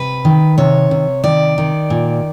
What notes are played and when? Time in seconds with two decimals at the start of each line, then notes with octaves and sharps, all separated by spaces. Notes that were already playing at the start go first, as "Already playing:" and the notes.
Already playing: C3 B4
0.25 D#3
0.58 C3 C#5
0.91 C3
1.24 D#3 D5
1.58 D#3
1.90 A#2